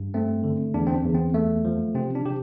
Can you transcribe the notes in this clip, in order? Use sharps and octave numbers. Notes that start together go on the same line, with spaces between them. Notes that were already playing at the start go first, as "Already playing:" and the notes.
Already playing: G2
A3 C4
D3
E2 D4
C4
D4
E2
C4
A3
F3
C3 C4
D4
C3 G4